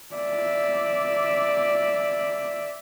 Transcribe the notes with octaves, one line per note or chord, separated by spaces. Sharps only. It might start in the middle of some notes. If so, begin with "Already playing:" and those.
D5 E5